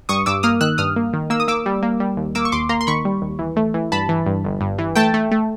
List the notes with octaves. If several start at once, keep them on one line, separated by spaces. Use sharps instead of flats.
G2 C#6 D#6
G2 D6 E6
A#3 D#6 F6
D#3 E6 F#6
G2 D#6 F6
A#3
D#3
A#3 E6
D#6
A#3 D6 E6
G3
A#3
G3
D#2
A#3 D6 E6
C#6
D#2 C6 D6
A#3 A#5 C6
C6
D#3 B5 C#6
G3
D#2
E3
A3
E3
G2 A5 B5
E3
G2
G1
G2
E3
A3 G5 A5
A3
A3